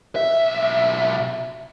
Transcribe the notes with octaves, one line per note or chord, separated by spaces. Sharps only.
B1 E5